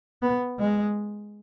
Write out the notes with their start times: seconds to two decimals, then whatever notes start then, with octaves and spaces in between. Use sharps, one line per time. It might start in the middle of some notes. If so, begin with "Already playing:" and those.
0.22 B3
0.59 G#3